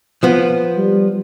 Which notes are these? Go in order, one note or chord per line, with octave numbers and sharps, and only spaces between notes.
F3 B3
G3